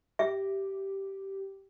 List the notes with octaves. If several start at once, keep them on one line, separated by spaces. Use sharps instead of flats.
G4 E5